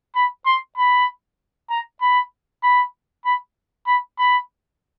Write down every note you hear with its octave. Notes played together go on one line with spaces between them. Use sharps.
B5
C6
B5
A#5
B5
B5
B5
B5
B5